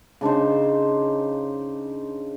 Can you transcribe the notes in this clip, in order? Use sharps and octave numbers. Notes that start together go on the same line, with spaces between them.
C#3 D4 D#4 C5